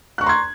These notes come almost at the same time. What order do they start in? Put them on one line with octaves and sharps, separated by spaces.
F#6 C#6 A#5 C6 G#6